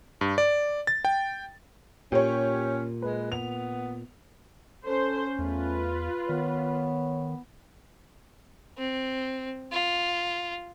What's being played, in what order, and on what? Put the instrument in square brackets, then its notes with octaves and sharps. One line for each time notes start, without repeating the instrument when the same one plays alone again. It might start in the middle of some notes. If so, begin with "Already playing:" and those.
[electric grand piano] G2
D5
A6
G5
[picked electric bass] A#2 [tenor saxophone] C#4 [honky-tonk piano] G4 C#5
[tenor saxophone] G#3 [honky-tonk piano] B4
[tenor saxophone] B3 [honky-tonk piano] F7
[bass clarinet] C#4 [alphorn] A4 [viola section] C5
[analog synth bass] E2 [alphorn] A3 [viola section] F4 B4
[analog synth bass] D#3 [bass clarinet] B3 [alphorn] C#5
[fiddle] C4
F4